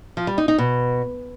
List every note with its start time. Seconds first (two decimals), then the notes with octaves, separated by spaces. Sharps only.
0.17 F3
0.27 G3
0.38 D#4
0.48 D#4
0.58 B2